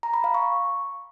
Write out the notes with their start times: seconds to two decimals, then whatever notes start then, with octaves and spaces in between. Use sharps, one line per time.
0.03 A#5
0.14 B5
0.24 F5
0.34 C#6